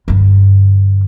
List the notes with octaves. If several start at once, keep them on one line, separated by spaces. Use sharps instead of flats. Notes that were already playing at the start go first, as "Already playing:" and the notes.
G2 D3